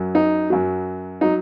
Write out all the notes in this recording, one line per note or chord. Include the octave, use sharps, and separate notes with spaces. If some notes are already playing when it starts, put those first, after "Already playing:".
Already playing: F#2 F#3
D#4
F#2 F#3
F#3 D#4